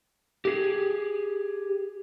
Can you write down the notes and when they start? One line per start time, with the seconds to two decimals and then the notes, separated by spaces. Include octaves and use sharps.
0.45 G4 G#4